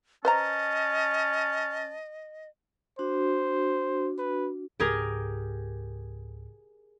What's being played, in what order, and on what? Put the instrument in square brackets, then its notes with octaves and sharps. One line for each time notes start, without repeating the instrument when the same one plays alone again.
[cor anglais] C#4 [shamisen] B4 C5 A#5 [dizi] D#5 [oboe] A5
[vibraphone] D4 F#4 [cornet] C5
[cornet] B4
[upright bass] C#2 G#2 [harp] G4 G#4 A#4